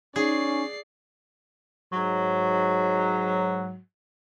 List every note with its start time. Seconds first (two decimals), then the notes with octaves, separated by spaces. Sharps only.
0.16 C#4 D#4 G#4 D5 C7
1.93 G#2 F#3